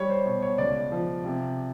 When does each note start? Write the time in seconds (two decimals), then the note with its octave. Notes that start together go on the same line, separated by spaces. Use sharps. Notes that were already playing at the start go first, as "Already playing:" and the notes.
Already playing: G3 C#5
0.10 C5
0.26 B2 C#5
0.42 C#5
0.58 C#2 D5
0.92 F3
1.25 C3